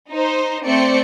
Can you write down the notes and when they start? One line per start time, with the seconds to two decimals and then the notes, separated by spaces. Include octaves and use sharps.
0.11 D#4 C5
0.64 A3 C4 C5 D5 C#7